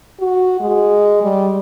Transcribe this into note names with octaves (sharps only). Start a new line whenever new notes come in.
F#4
G#3
G3